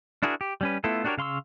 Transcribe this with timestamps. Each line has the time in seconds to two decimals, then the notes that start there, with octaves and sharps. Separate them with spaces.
0.23 D4 E4 F#4 G#4 A#4
0.41 G4
0.61 G3 C#4 B4
0.84 A3 B3 E4 F4 A4
1.04 D4 F#4 G4 A#4 C#5
1.18 C#3 F5 C6 C#6 E6